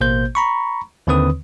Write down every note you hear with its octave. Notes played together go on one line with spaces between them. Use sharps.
A1 B2 A#3 C5 G6
A#5 B5 C#6
D#2 D3 D#3 C4 B4 D#6